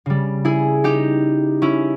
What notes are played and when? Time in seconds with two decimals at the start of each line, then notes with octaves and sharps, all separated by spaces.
0.06 C#3 G3
0.45 E4 G#4
0.84 D#4 G4
1.62 C#4 E4